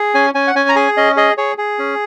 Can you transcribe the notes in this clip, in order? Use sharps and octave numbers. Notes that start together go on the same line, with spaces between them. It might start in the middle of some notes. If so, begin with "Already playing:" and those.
Already playing: G#4
C#4 G#5
C#4 G#5
F#5
C#4 G#5
A#5
G#4 G#5
C#4 D#5
G#4 D#5
G#4 C#5
G#4
C#4